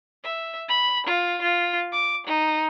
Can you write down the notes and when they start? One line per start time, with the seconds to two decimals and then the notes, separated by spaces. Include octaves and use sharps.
0.24 E5
0.68 B5
1.06 F4
1.41 F4
1.92 D6
2.27 D#4